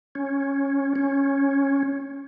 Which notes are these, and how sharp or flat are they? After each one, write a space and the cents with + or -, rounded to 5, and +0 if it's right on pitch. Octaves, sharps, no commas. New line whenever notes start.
C#4 -5
C#4 -5